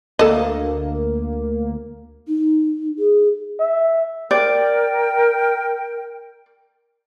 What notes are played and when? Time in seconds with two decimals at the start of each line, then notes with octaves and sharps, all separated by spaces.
0.19 D2 A#3 A4 D#5
2.28 D#4
2.99 G#4
3.60 E5
4.31 A#4 D5 G5